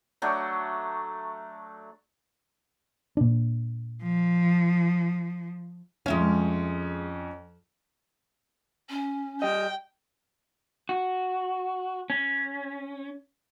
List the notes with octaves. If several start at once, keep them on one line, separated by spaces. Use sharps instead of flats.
F#3 A3 D4
A#2 D4
F3
F2 G#3 C#4 E5 F5
C#4
G3 D#5 G5
F#4
C#4